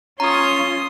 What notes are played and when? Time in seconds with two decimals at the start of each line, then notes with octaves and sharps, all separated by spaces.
0.20 C#4 F4 C#5 A#5 C6 D#6